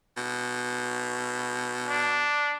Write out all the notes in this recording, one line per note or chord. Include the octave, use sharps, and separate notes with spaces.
B2
D4